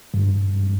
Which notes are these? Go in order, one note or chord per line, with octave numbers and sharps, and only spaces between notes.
G2